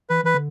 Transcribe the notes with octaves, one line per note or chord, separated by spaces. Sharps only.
E3 B4
E3 B4
D3